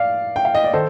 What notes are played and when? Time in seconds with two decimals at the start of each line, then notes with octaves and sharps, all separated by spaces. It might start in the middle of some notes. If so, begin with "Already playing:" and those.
Already playing: D5 F5
0.36 G5
0.45 F5
0.55 D#5
0.64 D5
0.73 D#3 A4 C5